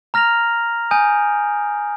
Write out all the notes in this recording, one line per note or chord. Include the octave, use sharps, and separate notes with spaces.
A#5 F6 A#6 F7
G#5 D#6 G6 D7